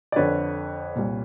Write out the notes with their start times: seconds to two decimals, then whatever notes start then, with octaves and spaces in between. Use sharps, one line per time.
0.12 D5
0.16 F2 D3 B4 C#5
0.96 C2 A#2